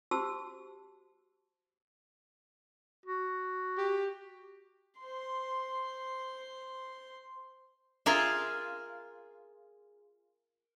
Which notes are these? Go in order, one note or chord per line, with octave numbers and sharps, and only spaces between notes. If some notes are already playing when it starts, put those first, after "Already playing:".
F#4 G4 C5 A5 E6
F#4
G4
C5 C6
F4 G#4 A#4 E5